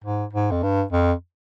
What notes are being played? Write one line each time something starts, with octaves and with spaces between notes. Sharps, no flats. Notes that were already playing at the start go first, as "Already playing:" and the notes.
G#2
G#2
F2
G2
F2